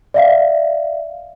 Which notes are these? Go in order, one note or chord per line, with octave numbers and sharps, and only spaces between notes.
D5 E5 F5